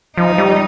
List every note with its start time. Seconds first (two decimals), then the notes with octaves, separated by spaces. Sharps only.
0.16 F3 D#4
0.38 G3